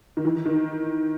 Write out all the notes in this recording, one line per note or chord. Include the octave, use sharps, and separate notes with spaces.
D#3
E3
D#3